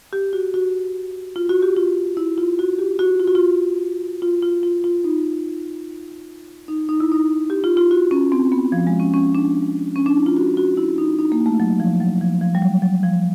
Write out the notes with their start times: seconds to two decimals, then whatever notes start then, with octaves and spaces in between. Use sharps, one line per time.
0.13 G4
0.33 F#4
0.54 F#4
1.36 F4
1.49 F#4
1.62 G4
1.76 F4
2.17 E4
2.38 F4
2.59 F#4
2.79 G4
2.99 F#4
3.20 F4
3.27 F#4
3.35 F4
4.22 F4
4.42 F4
4.63 F4
4.84 F4
5.04 D#4
6.68 D#4
6.89 D#4
7.00 E4
7.12 D#4
7.50 G4
7.64 F4
7.77 F4
7.91 F#4
8.11 C#4
8.32 C4
8.52 B3
8.72 F3
8.87 G#3
8.99 C#4
9.14 C#4
9.35 D4
9.96 C#4
10.06 D4
10.16 E4
10.26 F4
10.37 F#4
10.57 F#4
10.77 E4
10.98 D#4
11.19 D#4
11.32 A#3
11.46 A3
11.60 F#3
11.80 F3
12.00 F#3
12.21 F3
12.41 F3
12.55 G3
12.62 F#3
12.82 F#3
13.03 F3